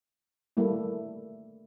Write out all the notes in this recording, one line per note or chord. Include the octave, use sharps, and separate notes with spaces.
G3 A3 A#3 E4